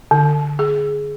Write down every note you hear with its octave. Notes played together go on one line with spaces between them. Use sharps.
D3
G#4